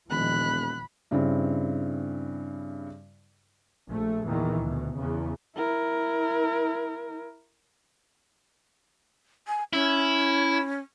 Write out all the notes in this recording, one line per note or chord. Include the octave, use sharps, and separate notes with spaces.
E1 A#2 D#3 F3 B5 F#6
G2 C#3 C4 E4
A#1 A3
E2 A#2 D#3 E3
D2 B2
E2 C#3 B3
E4 A#4
G#5
C#4 E4